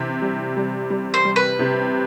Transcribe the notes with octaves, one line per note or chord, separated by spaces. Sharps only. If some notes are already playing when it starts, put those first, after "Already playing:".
Already playing: C3 E3 E5
G3
G3
G3
C5
G3
B4
C3